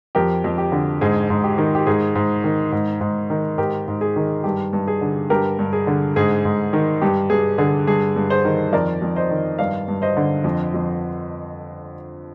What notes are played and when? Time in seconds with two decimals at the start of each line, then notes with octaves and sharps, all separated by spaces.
0.15 F2 G4 A#4
0.44 F2
0.58 G4
0.72 D3
1.01 G#2 G#4
1.30 G#2
1.44 G4
1.58 D#3
1.75 G4
1.86 G#2 G#4
2.15 G#2
2.44 D#3
2.72 G#2
3.01 G#2
3.30 D#3
3.58 G#2 G4 A#4
3.88 G#2
4.01 G#4
4.16 D#3
4.44 G2 G4
4.73 G2
4.88 G#4
5.01 D3
5.30 G2 G4 A#4
5.59 G2
5.73 G#4
5.87 D3
6.16 G#2 G#4
6.45 G#2
6.73 D#3
7.02 G2 G4
7.30 G2 G#4
7.58 D3 G#4
7.87 G2 G#4
8.16 G2
8.30 G#4 C5
8.45 D#3
8.73 F2 A#4 D5
9.02 F2
9.16 C5 D#5
9.30 D#3
9.59 G2 D5 F5
9.88 G2
10.02 C5 D#5
10.17 D3
10.44 F2
10.74 F2